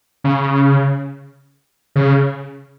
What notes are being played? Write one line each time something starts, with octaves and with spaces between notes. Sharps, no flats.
C#3
C#3